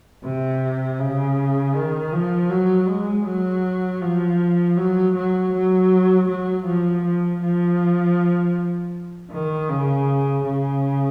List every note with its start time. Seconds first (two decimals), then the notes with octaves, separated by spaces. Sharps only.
0.24 C3
0.99 C#3
1.75 D#3
2.13 F3
2.50 F#3
2.88 G#3
3.26 F#3
4.02 F3
4.77 F#3
5.15 F#3
5.53 F#3
6.29 F#3
6.66 F3
7.04 F3
7.41 F3
9.31 D#3
9.69 C#3
10.44 C#3